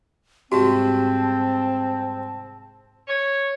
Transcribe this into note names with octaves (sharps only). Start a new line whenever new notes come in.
C2 G#2 C3 C4 F#4 G4 A5
C#5